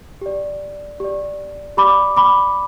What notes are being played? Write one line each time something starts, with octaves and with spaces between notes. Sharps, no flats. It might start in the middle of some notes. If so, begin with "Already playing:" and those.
G4 D5
G4 D5
G4 D5 B5 D6
B5 D6